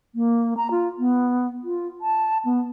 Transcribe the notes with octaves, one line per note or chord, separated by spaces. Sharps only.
A#3
A#5
F4
B3
F4
A5
B3